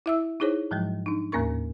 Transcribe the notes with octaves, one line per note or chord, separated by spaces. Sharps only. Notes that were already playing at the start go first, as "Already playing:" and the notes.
E4 E5 E6
D#4 E4 G#4 C5 C#5
G#2 F3 F#3 G#3
D4 D#4
D#2 A2 A#3 C#4 A#4 C#6